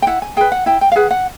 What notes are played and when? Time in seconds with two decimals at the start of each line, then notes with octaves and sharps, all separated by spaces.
0.02 G5
0.07 E4 F#5
0.22 G#5
0.37 G#4 B4 G5
0.52 F#5
0.66 E4 G5
0.81 G5
0.92 F5
0.96 G#4 B4 F#5
1.11 F#5